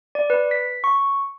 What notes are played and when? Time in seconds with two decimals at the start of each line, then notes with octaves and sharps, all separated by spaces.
0.15 D5
0.30 B4
0.51 B6
0.84 C#6